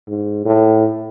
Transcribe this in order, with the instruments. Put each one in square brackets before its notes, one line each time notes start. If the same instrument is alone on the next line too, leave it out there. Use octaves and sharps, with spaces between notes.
[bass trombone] G#2
A2